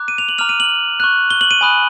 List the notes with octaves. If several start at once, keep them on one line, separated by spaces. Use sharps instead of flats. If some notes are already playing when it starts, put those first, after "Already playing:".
Already playing: A#5 D6 F#6
D#7
F7
F#7
A#5 D6 F6 F7
D#7
F#7
C#6 F#6
G7
F#7
D#7
G#5 B5 D#6 F#6